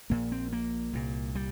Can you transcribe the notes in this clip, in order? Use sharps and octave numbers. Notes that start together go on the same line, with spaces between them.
A#1 A#2 A#3
C4
A#3
C2 A#2
G3